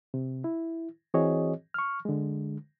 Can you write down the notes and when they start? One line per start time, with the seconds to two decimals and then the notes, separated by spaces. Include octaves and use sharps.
0.14 C3
0.44 E4
1.14 E3 C4 F#4 G#4 C#5 D#5
1.74 C#6 F6
2.05 D3 G#3